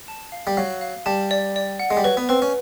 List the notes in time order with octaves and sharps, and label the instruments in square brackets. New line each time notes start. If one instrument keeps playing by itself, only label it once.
[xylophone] A5
F5
[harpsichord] G3
[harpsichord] F#3 [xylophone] F5
[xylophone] F5
[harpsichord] G3 [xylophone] A5
[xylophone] D5
D5
F#5
[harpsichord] G#3
G3
[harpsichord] F#3 [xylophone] B4
[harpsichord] B3
[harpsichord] C4 [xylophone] B4
[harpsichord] C#4